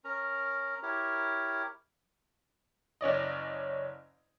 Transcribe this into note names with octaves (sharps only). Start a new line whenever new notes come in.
C#4 A#4 A#5
E4 G4 A#4 C#5
F#1 C#4 D5 D#5